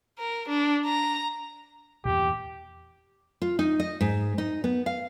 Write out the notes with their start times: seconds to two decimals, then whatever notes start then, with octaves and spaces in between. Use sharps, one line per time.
0.18 A#4
0.48 D4
0.85 A#5
2.05 E2 G2 A#2 G4
3.42 F4
3.59 D#4
3.80 D#5
4.01 G#2
4.38 D#4
4.64 B3
4.86 F5